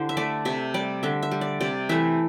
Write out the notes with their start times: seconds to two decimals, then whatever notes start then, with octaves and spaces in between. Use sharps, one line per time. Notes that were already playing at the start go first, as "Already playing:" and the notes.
Already playing: D3 E4 G4 C5
0.09 E5
0.17 A3 D5
0.45 C3 E5
0.74 G3 D5
1.03 D3 E5
1.23 E5
1.31 G3
1.41 D5
1.61 C3 D5
1.89 E3 A3 E5